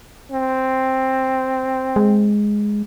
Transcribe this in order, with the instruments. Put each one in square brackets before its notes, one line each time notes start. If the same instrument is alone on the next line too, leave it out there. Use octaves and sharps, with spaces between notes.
[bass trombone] C4
[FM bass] G#3